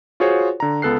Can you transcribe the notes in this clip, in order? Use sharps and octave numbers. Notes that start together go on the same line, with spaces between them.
F4 F#4 G#4 C5 C#5
D3 A#5
C#2 B3 A4 F#6 C7